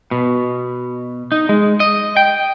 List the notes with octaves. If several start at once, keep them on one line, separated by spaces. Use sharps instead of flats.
B2
D#4
G#3
D#5
G5